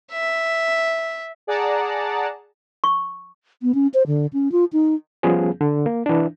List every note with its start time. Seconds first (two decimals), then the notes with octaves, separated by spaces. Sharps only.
0.12 E5
1.47 G#4 D5 F#5 A5 A#5
2.84 C#6
3.62 B3
3.75 C#4
3.94 C5
4.07 D3
4.33 C#4
4.52 F4
4.73 D#4
5.23 F3 G3 B3 C#4 G#4
5.61 D3
5.86 A#3
6.06 E3 D4